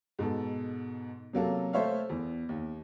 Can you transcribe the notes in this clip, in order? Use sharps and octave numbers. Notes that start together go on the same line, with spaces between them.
G#2 B2 A4
C3 F#3 A#3 A4
A3 A4 C5 C#5 E5 F5
E2
D#2